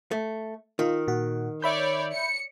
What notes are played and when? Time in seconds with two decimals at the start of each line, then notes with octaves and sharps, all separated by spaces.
0.11 A3
0.79 D#3 F4
1.08 A#2 F#4
1.62 C#5 D5 E5 B5 G6
2.13 C#7